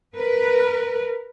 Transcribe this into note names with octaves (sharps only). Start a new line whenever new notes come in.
A#4 B4